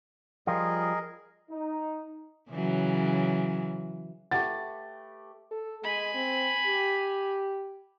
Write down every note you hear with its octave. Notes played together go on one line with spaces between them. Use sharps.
F3 G3 F4 G#4 A#4 D#5
D#4
C#3 E3 F#3
A3 G4 B4 F#5 A6
A4
G#3 G#5 B5
C4
G4